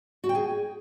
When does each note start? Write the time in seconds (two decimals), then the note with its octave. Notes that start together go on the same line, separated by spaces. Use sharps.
0.24 F#4
0.29 G5
0.35 G#4